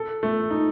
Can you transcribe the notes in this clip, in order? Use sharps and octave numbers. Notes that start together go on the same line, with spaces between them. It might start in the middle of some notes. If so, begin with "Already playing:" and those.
Already playing: A4
A3
D#4